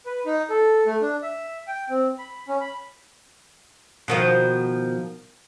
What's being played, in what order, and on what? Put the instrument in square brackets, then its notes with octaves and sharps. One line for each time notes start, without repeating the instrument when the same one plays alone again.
[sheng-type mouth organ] B4
D#4
A4
A3
D4
E5
G5
C4
B5
C#4
B5
[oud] B2 D#3 F3